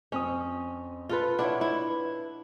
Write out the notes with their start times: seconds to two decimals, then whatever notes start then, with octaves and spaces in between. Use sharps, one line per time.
0.12 F2 C4 C#4 D#6
1.09 F4 A4 B4
1.39 D4 E4 C#5 E5 F#5
1.61 E4
1.90 B4